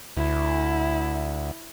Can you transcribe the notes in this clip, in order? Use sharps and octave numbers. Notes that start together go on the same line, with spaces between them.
D2 E4